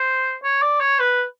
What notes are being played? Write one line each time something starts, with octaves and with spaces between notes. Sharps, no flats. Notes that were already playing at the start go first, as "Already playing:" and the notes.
Already playing: C5
C#5
D5
C#5
B4